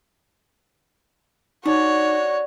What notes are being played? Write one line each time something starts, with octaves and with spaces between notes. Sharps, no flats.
D4 D#4 F#4 C#5